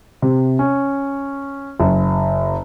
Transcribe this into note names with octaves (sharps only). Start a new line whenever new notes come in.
C3
C#4
F#1